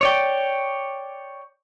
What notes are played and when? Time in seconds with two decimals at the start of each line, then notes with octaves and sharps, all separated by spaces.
0.01 C#5 D5 G5